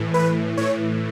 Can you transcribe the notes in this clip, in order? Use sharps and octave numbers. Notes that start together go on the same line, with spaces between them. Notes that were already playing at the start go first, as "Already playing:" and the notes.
Already playing: A2 E3
B4
A2 E3 C#5